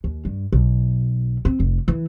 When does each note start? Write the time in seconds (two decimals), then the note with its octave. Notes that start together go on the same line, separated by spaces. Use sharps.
0.04 D#2
0.25 G2
0.52 B1
1.45 C4
1.60 F1
1.88 E3